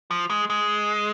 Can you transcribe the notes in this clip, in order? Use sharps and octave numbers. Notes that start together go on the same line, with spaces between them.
F3
G#3
G#3